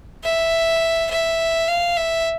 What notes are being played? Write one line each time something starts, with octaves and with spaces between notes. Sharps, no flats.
E5
E5
F5
E5